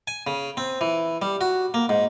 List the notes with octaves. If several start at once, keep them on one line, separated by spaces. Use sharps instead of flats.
G#5
C#3
C4
E3
G3
F#4
A#3
G#2